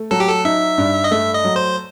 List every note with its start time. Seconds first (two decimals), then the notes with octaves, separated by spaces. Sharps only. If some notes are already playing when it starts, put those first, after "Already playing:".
Already playing: A3
0.11 F#3 A4
0.20 G4
0.29 A4
0.45 D#4 E5
0.78 G2
1.04 D#5
1.11 A3 E5
1.34 D#5
1.45 F#3
1.56 C5